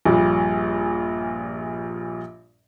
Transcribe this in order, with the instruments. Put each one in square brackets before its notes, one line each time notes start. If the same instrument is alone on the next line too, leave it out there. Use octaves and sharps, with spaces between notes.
[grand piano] A#1 G2 A#2